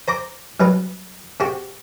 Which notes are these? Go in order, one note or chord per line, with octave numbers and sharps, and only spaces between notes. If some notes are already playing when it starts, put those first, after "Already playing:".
C5 A#5 D6
C2 F#3 B4
C3 F#4 G4